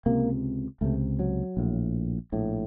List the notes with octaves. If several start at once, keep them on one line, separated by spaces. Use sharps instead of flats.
C#2 C3 A#3
C#2 C3 A3
F#3
A#1 A2
A#1 A2